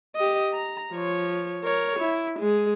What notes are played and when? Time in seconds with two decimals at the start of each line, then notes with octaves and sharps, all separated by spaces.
0.16 G4 D#5
0.54 A#5
0.92 F3 C#5
1.64 A#4 C#5
1.99 E4
2.40 G#3 G#4